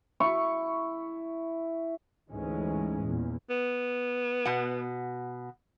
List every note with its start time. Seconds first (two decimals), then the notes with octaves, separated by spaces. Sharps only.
0.20 E4 C#6
2.30 D2 G#2 E3 G#3 C#4
3.03 E2 A#2
3.50 B3
4.45 B2 F#5